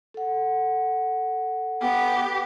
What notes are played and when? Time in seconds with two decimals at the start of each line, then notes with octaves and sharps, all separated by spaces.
0.14 A4 F#5
1.81 B3 G4